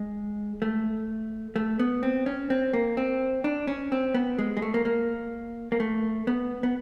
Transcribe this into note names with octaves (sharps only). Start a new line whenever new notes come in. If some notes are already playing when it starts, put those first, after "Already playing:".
Already playing: G#3
A3
A3
B3
C4
C#4
C4
A#3
C4
D4
C#4
C4
B3
G#3
G#3
A3
A#3
A#3
A#3
A3
B3
B3